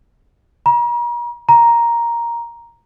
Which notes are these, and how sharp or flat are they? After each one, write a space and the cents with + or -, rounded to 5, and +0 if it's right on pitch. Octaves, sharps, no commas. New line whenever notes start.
A#5 +40
A#5 +5